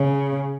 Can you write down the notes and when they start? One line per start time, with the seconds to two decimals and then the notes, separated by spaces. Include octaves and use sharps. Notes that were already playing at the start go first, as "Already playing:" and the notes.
Already playing: C#3